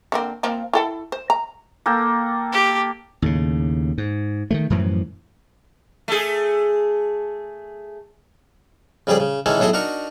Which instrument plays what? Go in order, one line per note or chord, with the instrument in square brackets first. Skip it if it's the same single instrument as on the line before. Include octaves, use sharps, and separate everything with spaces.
[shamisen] D3 A#3 C4
F3 A#3 C4
E4 A4 G5
C5
A#5
[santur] A#3 A4 G5
[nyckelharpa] G4
[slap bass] D#2 A2 C#3
G#2
D#3 E3 A3
F#2 A2 E3 F3
[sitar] A3 G#4
[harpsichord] F2 C#3 G3 G4 G#4 D5
C#3
D#3 E3 G#3 C#4 A4
B1 A2 G#4 A4 D#5 G#5
D4 D#4 F#4 A#4 C#6